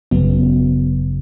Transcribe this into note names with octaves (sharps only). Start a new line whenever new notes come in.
G#1 F#2 C#3 F#3 B3